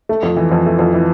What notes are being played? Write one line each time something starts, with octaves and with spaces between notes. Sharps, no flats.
A3
F2
E3
F2
A3
F2
E3